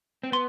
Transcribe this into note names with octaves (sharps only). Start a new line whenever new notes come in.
C4
B3 C6